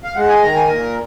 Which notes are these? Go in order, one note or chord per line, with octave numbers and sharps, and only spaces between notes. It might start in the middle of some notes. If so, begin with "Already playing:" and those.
F5
G#3 F#5
G#5
D#3 A#5
G#5
A#2 A#4